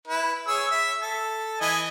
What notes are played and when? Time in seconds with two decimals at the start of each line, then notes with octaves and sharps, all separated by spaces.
0.07 E4 B4
0.47 G#4 C#5 E6
0.71 E5
1.00 A4
1.61 E3 D#5 G#5